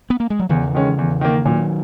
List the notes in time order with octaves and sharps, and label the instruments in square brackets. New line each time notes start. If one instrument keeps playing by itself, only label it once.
[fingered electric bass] B3
A#3
G#3
F#3
[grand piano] E2 [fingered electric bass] C#3 E3
[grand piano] D#3 G#3 C#4
E2
D#3 A#3
[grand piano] A#2 [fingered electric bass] D#3 F#3